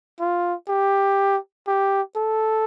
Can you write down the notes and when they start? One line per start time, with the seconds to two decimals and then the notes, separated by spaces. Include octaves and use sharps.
0.20 F4
0.69 G4
1.67 G4
2.16 A4